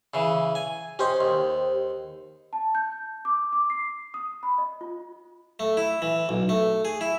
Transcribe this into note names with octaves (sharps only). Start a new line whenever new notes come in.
C#3 E3
G#5
C#4 G4 C5 D#5
D#2
A5
G6
D6
D6
C7
D#6
B5
D#5
F4
A3
E4
E3
B1
A3
G#4
E4